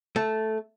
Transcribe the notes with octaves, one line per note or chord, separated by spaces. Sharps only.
A3